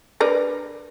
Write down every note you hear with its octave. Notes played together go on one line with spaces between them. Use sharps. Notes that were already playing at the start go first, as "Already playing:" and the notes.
D4 A#4 B4